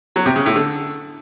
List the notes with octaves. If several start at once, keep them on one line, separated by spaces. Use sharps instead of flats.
F#3
C3
C#3
A2
D3